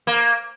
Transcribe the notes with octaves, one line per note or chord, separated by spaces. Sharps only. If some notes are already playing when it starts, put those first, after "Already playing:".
A#3